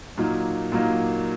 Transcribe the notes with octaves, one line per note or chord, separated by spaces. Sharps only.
A#2 F#3 A#3 D#4
A#2 F#3 A#3 D#4